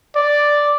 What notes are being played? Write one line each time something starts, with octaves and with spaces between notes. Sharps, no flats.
D5